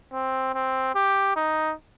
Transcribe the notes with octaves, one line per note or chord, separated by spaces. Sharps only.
C4
C4
G4
D#4